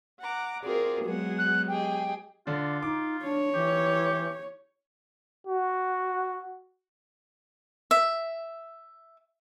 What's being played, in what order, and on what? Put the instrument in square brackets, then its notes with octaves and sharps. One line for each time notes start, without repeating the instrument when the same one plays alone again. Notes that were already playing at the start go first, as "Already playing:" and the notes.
[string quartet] F#5 A#5 D6
[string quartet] C4 F4 D5 [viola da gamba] F#4 G#4 A#4
[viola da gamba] F#3 G#3 B3 [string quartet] G#4 F#5
[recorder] F#6
[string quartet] G4 G#4 D#5 [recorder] G5
[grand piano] D3 D4 [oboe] F4
[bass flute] D#4 [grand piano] D6
[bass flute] D4 [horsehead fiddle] C#5
[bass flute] E3 [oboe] G4
[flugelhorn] F#4
[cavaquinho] E5